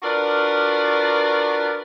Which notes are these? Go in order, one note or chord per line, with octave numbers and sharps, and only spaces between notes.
D4 F4 F#4 A#4 B4 D5